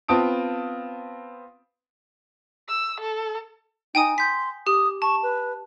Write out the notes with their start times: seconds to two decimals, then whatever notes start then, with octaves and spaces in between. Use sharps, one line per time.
0.08 B3 C4 F4 A5 D#6 D7
2.68 E6
3.00 A4
3.95 D#4 G5 G#5 D#6
4.18 C6 G6 B6
4.67 G4 D#6
5.02 A5 C#6
5.23 B4